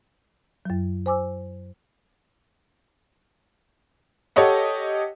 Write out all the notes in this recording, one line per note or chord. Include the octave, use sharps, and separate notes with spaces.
F#2 F#3
C5 G#5 D6 E6
G4 A4 C#5 D#5 F#5